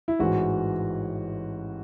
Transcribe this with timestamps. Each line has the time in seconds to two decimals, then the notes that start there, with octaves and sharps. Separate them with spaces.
0.08 E4
0.19 A1 G#2 E3 F#4